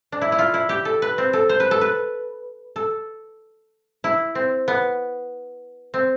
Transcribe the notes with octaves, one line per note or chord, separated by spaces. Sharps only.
D4
E4
E4
F4
E4
G4
A4
B4
C4
A4
C5
B4
A4
B4
A4
E4
C4
B3
C4